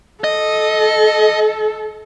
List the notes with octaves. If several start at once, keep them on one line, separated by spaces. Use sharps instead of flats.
A4 D#5